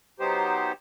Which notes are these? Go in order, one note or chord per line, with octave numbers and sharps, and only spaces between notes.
F#3 B3 D#4 G4 C5